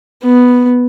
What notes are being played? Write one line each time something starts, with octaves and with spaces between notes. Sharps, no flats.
B3